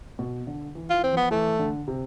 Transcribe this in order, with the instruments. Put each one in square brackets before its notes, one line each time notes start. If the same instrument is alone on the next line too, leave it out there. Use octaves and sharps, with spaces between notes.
[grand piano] B2
D3
E3
[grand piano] E3 [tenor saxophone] F4
[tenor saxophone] C4
[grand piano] F3 [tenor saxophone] B3
[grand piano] E3 [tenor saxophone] A3
[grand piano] D3
C3